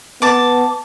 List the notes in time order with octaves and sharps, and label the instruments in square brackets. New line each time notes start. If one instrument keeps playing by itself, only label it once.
[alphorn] B3 [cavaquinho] A5 D6